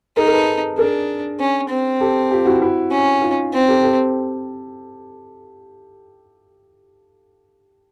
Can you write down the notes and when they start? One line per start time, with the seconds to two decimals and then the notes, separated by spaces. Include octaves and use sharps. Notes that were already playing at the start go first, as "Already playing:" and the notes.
0.17 D#4 G#4 A#4
0.27 A#4
0.33 A4 B4
0.78 D4 G#4 A#4
1.40 C#4
1.70 C4
2.00 G4 A4
2.31 F4 G4
2.45 E4 F#4
2.62 E4 F#4
2.91 C#4
3.22 D#4 F4
3.53 C4
3.68 G4 A4
3.83 G4 A4